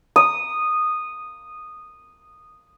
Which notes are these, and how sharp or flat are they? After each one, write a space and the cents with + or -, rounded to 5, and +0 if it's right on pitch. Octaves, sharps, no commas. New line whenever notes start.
D#6 -10